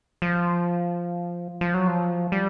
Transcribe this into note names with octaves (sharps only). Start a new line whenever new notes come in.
F3
F3
F#3
F3
G3